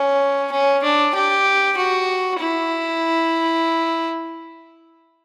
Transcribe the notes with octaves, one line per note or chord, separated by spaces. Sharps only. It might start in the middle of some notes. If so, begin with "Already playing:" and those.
Already playing: C#4
C#4
D4
G4
F#4
E4